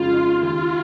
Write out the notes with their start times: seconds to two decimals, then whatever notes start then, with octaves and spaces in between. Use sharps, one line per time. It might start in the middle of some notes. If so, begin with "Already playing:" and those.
Already playing: F2 C#3 G#3 F4
0.13 D#4
0.42 D#2 F4